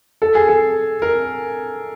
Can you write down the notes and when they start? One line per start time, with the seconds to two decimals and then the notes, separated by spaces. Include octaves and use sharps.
0.22 A4
0.35 G#4
0.48 A4
1.02 A#4